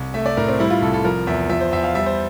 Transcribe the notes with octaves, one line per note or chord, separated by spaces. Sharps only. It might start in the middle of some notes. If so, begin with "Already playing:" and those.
Already playing: C2
A3 E5
D5
A2 A#4
C4
G3 E4
F4
C2 A4
A4
F3 A#4
E2 E5
F3 E5
C5
E2 E5
F5
G3 E5
C5